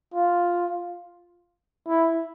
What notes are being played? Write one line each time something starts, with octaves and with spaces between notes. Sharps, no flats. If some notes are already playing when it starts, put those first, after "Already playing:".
F4
E4